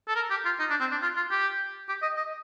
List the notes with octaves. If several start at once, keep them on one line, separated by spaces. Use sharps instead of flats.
A4
A#4
G4
F4
D#4
D4
C4
D4
F4
F4
G4
G4
D#5
D#5